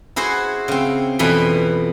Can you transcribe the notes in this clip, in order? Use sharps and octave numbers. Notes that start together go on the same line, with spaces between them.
E4 F#4 G#4 C5 F#5
C#3 C4
F2 B2 E3 B4 B5